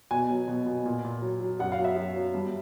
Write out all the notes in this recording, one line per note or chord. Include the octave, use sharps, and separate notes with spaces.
B2 G#5
F#3
B2
B2
A#2
A#2
F#3
F#3
F#2 F#5
F5
F#3
E5
F#2
F#3
G2